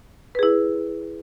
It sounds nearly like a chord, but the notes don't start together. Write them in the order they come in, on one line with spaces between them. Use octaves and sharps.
B4 G#4 E4